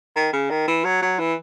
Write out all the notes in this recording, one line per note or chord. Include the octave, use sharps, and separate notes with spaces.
D#3
C#3
D#3
E3
F#3
F#3
E3